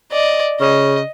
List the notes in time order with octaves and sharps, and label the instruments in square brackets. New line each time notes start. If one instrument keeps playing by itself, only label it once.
[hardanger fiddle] D5 D#5
[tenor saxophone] C#3 [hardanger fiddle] D#5